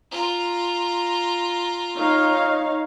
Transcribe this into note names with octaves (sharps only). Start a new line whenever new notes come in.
F4 A#5
D#4 C#5 F5